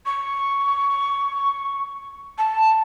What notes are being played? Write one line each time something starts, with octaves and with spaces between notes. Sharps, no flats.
C#6
A5